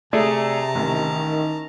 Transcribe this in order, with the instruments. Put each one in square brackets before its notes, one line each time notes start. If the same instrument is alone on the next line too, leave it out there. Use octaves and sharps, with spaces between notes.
[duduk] C3 [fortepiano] A3 G#4 D5 [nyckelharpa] A5 A#5
[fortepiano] A1 [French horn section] D#3